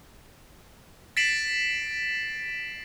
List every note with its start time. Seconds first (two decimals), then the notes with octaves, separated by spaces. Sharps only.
1.17 A6 B6 C7 D7 E7 F#7